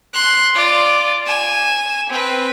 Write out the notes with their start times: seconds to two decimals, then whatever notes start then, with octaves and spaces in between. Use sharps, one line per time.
0.14 C6 F#6
0.54 F4 D5
1.26 G#5 E7
2.09 C4 B4